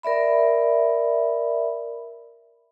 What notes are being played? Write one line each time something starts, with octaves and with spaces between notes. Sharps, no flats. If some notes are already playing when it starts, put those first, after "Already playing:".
A#4 D5 E5 B5